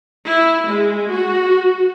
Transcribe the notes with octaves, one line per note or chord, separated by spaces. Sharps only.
E4
G#3
F#4